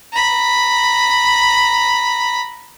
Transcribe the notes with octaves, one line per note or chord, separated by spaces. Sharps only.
A#5 B5